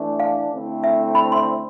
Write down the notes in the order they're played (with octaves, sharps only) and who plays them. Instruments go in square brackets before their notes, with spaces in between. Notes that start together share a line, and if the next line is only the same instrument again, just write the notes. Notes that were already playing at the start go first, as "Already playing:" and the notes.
Already playing: [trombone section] E3 A3 D4
[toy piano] F5
[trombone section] D3 A3 C4 E4
[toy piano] E5
B5
C6